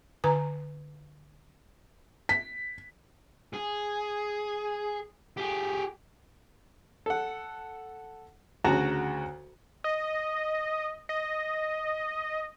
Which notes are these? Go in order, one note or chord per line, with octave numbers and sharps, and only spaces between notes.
D3 B4 G#5 A#5
B6
G#4
G4 G#4
A4 F#5
D2 C#3 F#4 A5 A#5
D#5
D#5